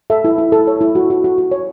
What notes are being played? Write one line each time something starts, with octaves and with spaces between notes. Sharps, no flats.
A4 E5
E4
E4
A4
C#5
E4
F#4
F#4
F#4
F#4
C#5